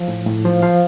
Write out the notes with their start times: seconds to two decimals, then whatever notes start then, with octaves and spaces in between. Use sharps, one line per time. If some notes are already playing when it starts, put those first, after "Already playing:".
Already playing: F3
0.08 A2
0.26 A2
0.45 F3
0.62 F3 F5